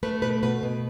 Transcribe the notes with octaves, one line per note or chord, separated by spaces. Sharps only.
A3 B4
B2 B4
B2 B4
B2